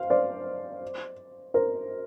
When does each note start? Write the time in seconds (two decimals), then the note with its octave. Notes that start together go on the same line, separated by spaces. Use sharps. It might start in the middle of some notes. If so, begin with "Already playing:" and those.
Already playing: C5 F5
0.10 C5 D5
1.54 A#4 C5